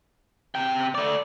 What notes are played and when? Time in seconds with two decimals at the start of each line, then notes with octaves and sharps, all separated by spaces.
0.55 C3 G5
0.95 A3 D5